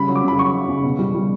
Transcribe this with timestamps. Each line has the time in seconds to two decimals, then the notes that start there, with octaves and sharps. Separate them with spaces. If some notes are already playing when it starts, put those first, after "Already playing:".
Already playing: C#3 G3 B5
0.08 F#3
0.16 D6
0.23 C#3 B5
0.38 F#3 C#6
0.54 F#3
0.69 C#3
0.84 B2
0.99 G3
1.15 G3